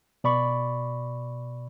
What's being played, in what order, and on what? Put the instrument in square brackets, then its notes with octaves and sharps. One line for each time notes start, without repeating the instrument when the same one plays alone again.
[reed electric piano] B2 D5 B5 C#6